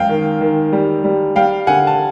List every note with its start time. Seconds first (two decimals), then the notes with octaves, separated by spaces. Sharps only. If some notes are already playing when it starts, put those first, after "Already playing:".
Already playing: F#2 G#3 F5 G5
0.09 D#3
0.41 D#3
0.73 G3
1.04 G3
1.36 G3 F5 G5
1.67 D3 F#5 G#5
1.87 A5